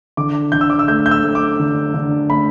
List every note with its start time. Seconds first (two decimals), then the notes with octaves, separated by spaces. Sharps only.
0.17 D3 D6
0.52 D3 G6
0.61 E6
0.70 D6
0.79 E6
0.88 A3 G6
1.06 G6
1.11 E6
1.23 A3
1.35 D6
1.60 D3
1.94 D3
2.30 A3 B5